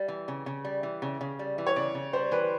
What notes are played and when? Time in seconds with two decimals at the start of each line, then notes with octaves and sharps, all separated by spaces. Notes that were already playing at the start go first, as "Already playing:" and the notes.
Already playing: G3
0.08 E3
0.28 C#3
0.46 C#3
0.65 G3
0.83 E3
1.02 C#3
1.21 C#3
1.39 G3
1.58 E3
1.67 C#5
1.76 C#3 D5
1.95 C#3
2.13 G3 C5
2.31 E3 B4